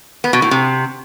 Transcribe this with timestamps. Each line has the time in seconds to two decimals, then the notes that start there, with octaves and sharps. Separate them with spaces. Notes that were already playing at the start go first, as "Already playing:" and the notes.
0.24 B3
0.33 B2
0.42 A2
0.51 C3